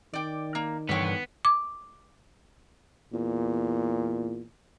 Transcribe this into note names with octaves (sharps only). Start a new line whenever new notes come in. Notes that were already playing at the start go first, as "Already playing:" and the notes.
D#3 D5 G5
A#3
G2 D3 E3 B3 C#5 G5
D6
E2 A#2